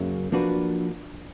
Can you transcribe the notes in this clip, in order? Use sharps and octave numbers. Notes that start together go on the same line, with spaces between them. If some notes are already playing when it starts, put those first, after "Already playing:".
Already playing: F#2 C#3 F#3 A#3 C#4
F3 A#3 D4 F#4 B4